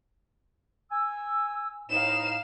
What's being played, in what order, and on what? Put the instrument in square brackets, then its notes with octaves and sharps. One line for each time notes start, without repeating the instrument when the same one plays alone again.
[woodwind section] G#5 E6
[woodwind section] A2 D#4 [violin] F5 E7